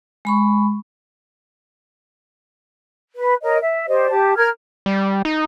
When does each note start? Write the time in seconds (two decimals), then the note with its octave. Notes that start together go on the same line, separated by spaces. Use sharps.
0.25 G#3 B5 C#6
3.16 B4
3.43 A#4 C#5 D#5
3.61 E5
3.88 G4 C5 D5 D#5
4.11 G4 A5
4.37 A#4 F6 G#6
4.86 G3
5.25 D#4